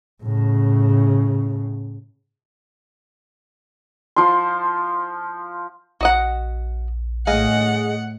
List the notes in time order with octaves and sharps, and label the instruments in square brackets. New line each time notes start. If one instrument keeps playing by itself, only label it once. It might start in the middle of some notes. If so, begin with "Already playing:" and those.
[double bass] A2 C#3
[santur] F3 C6
[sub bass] A#1 [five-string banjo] F#4 D#5 F#5
[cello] A2 F#5 [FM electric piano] G#4 D#5 [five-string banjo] F5